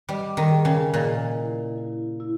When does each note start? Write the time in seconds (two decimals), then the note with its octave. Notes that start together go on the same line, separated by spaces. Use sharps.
0.09 G3 D#5
0.37 D#3
0.51 G#4
0.65 C#3
0.93 A#2 D#5
1.35 E4
1.78 E4
2.20 E4